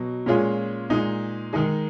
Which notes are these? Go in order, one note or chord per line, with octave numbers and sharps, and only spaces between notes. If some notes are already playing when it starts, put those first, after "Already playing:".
Already playing: B2 F#3
A#2 G#3 C#4 F4 G#4
A#2 G#3 D#4
D#3 G#3 D#4 G#4